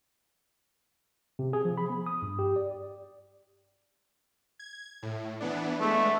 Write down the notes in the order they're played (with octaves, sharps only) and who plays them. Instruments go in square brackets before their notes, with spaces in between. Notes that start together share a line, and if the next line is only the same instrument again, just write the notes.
[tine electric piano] C3
G#4
F3
B5
B3
D#6
G2
G4
D5
[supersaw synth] G#6
A2
E3 B3 D4
[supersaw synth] G#3 B3 D4 [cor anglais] A3